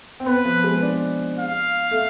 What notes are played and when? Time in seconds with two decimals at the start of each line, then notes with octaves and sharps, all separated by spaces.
0.20 C4
0.26 B3 B4
0.45 F3
0.64 G#3
0.83 D4
1.39 F5
1.91 A3